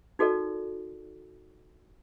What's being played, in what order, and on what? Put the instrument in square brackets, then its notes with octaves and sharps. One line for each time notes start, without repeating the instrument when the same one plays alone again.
[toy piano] D#4 F#4 A4 A#4 D5